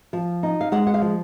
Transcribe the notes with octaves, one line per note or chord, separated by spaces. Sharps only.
F3
D#4
F5
G#3 F#5
F#5
F5
F3